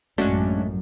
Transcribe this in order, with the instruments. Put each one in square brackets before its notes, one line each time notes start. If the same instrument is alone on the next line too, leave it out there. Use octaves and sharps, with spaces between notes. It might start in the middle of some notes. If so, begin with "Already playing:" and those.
[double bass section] A1 F#2 [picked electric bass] G#3 A3 [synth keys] C#4 D4 F#4